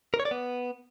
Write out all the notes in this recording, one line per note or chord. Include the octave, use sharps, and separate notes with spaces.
A#4
C#5
D5
B3